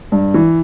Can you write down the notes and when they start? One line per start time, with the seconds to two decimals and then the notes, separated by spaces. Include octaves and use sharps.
0.12 G2
0.34 E3